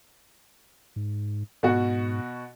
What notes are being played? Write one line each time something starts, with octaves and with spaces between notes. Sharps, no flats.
G#2
G#2 B2 F#4